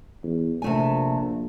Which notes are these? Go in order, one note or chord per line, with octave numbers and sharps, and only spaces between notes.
E2
A#1 C3 A3 G#5